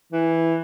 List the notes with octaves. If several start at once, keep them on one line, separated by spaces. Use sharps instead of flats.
E3